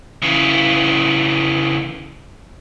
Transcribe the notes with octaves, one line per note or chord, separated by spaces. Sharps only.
C#3 E3